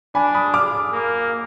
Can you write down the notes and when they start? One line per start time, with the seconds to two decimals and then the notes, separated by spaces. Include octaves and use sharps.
0.15 D4 G#5 B5
0.35 B5 D#6
0.54 D6 F6
0.93 A#3